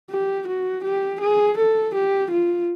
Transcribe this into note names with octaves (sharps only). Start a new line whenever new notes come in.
G4
F#4
G4
G#4
A4
G4
F4